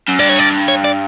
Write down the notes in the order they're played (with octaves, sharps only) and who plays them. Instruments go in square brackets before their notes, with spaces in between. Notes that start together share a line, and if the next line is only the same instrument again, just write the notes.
[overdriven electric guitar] F#2
[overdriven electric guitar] G2 [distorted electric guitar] D5
[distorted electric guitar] C#5
D5
C#5
D5